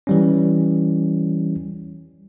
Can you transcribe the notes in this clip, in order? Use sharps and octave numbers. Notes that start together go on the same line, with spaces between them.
E3 G3 C#4